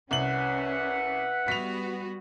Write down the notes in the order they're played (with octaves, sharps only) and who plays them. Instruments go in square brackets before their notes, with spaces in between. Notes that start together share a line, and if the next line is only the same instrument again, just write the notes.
[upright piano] C2 F#7 [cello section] C#4 [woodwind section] B4 E5 F#5
[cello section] G3 B3 F#4 [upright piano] B6 F7